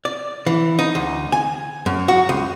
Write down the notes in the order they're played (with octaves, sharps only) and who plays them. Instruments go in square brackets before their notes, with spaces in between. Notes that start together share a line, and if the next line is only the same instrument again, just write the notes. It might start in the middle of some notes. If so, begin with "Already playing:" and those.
[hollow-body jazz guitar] D5
E3
D#4
D2
G#5
F#2
F#4
C#2